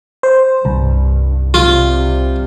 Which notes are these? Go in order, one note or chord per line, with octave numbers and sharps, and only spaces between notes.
C5
C2 G2
C3 G3 F4